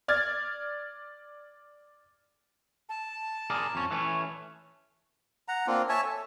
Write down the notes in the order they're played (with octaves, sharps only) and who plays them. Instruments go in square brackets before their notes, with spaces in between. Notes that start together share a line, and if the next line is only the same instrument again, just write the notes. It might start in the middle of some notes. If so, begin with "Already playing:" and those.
[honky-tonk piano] D5 F6 G#6 A6
[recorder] A5
[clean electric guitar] G#4 A#4 D5
F2 C#4
E3 A3 C#4
[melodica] F#5 A#5
A#3 C4 D4 F4
C#5 E5 G#5 A5
A4